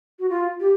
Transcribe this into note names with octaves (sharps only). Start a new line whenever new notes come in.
F#4
F4
G4